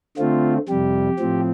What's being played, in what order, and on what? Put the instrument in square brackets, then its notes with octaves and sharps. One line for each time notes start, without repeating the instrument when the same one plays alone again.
[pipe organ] D3 A3 C4 F4
F2 C3 G3 G4
A2 F3 C4